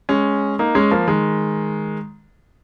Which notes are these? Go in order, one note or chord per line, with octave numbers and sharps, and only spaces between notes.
G#3 C#4
A#3 D#4
G#3 C#4
F3 A#3
D#3 G#3